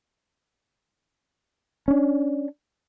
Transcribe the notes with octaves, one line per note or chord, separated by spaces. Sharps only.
C#4 D4